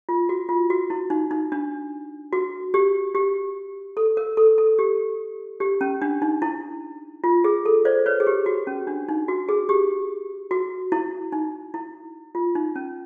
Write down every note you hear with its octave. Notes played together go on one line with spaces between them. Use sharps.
F4
F#4
F4
F#4
E4
D#4
D#4
D4
F#4
G4
G4
A4
A#4
A4
A4
G4
G4
C#4
D4
D#4
E4
F4
G#4
A4
C5 D5
B4 C#5
G#4
G4
F#4
C#4
D4
D#4
F#4
G#4
G4
F#4
E4
D#4
E4
F4
D#4
C#4